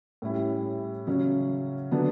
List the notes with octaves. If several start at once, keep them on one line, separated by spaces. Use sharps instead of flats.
A2 G3 C#4 E4
C#3 F#3 C#4
D3 F#3 B3 D4